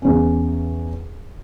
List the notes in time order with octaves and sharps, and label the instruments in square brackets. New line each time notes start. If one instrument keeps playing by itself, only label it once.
[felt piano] E2 C#4